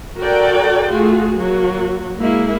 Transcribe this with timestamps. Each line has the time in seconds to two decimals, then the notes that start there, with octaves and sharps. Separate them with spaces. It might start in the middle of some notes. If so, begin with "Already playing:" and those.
0.18 F#4 A4 A#4 D5 F#5 G5
0.90 A3 F4 F#4 G#4
1.33 F#3 A#3 F#4
2.17 G#3 A#3 E4